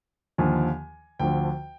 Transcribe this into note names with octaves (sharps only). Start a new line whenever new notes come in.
D#2 D3 F3 G#5
D2 D3 F3 G5